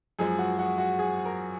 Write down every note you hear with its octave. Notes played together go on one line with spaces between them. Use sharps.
F#2 F3 G#3 G#4
F#4
F#4
F#4
G#4
A#4